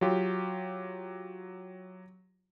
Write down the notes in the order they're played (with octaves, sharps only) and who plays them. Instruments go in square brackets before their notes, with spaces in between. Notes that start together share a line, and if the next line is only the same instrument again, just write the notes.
[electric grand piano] F#3 F4 G4